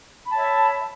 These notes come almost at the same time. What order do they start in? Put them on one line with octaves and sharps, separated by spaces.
B5 A5 C#5 E5